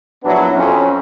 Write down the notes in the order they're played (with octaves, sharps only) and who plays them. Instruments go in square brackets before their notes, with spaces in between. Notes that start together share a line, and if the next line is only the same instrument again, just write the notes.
[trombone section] A#1 F#3 B3 D4 E4
F2 C#4